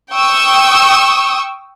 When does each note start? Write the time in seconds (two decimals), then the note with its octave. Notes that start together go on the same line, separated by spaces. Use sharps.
0.13 G5 C#6 D#6 E6